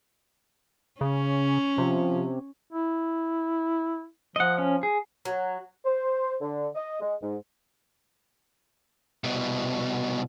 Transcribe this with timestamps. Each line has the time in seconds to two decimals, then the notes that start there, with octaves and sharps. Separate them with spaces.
1.01 C#3 C#4
1.78 C3 F3
2.73 E4
4.36 F3 D#5 F#5
4.58 C#4
4.83 G#4
5.25 F#3
5.85 C5
6.41 D3
6.75 D#5
7.01 G#3
7.22 G#2
9.24 C2 B2